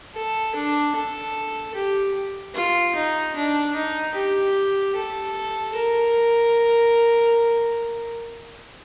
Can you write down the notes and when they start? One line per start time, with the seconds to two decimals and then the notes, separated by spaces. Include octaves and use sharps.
0.15 A4
0.56 D4
0.96 A4
1.75 G4
2.55 F4
2.96 D#4
3.36 D4
3.76 D#4
4.15 G4
4.96 A4
5.76 A#4